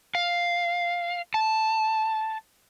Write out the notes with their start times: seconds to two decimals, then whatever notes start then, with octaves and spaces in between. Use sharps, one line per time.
0.15 F5
1.34 A5